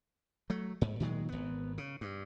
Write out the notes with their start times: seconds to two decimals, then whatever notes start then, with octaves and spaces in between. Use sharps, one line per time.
0.50 F#3 A3
0.81 G#2
1.00 A#2 D#3 F#3 G#3
1.29 G#1 B3
1.78 C#3
2.01 G2